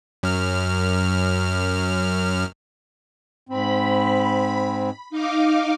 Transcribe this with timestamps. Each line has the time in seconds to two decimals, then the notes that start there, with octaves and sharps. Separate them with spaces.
0.23 F#2 F6
3.49 G#2 C4 B5
5.10 D#4 F5 D6